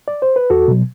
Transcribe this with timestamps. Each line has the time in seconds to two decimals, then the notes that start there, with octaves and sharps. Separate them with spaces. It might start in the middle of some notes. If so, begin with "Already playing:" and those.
0.08 D5
0.22 C5
0.36 B4
0.50 E2 F#4 A4
0.68 B2 F#3